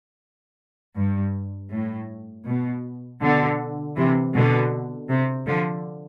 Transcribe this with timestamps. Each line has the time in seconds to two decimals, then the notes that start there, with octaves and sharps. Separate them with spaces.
0.97 G2
1.72 A2
2.47 B2
3.21 B2 D3
3.96 C3 E3
4.34 B2 D3
5.09 C3
5.46 D3 F3